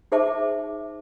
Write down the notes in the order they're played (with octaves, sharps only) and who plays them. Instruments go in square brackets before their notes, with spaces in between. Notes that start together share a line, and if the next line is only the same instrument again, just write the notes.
[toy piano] D#4 G#4 C5 E5 A5 D6